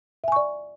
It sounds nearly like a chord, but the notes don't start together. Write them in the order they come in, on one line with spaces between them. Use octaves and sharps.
E5 G#5 C#6 D5